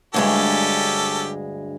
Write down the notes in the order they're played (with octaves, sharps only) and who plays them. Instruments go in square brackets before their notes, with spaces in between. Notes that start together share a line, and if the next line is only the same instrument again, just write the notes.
[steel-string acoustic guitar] D2 G2 G#3 [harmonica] C#4 G4 A4